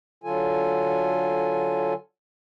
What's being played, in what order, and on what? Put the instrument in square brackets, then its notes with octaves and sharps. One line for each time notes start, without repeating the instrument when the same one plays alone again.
[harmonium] D3 F#3 F4 A4 G#5